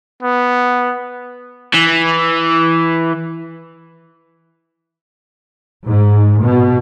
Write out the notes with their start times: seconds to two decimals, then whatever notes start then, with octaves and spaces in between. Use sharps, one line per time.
0.23 B3
1.75 E3
5.87 G#2
6.44 B2